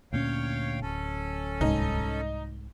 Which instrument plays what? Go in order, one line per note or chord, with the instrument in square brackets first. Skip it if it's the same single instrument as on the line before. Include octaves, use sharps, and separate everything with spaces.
[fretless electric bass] D2 A#2 C#4 [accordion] C#5 F5 G5
[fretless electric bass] D1 [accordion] C#4 A4
[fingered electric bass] C2 G#2 [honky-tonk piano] D#4